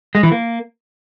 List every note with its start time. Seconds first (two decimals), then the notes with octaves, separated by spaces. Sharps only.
0.15 G#3
0.23 E3
0.32 A#3